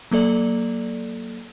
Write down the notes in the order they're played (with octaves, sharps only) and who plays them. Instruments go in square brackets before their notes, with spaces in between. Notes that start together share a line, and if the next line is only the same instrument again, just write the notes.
[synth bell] F#3 A#3 A4 D5